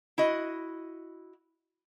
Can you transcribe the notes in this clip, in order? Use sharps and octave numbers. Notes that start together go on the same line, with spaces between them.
E4 F#4 D#5